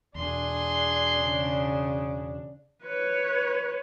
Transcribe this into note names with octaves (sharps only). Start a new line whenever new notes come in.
E2 B2 D4 G#4 C6
C#3
B4 C#5